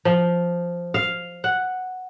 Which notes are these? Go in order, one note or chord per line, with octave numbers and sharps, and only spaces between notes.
F3
F5
F#5